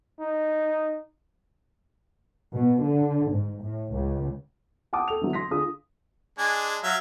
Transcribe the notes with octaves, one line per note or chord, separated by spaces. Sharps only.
D#4
B2
D3
G#2
A2
C#2
F#5 G5 A5 D6 D#6
A4 F7
D3 E3 F#3 E4
C6 A#6 B6
D3 F4 G#4 D#6
G#3 D4 G#5
F#3 E5 F5